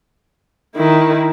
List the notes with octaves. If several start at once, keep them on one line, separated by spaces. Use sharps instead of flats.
D#3 E4